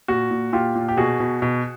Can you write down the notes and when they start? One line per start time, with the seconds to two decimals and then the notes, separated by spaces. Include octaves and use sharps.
0.08 A#2 F#4
0.31 A#2
0.53 A#2 F4 G4
0.75 A#2
0.88 G4
0.97 B2 F#4 G#4
1.20 B2
1.42 B2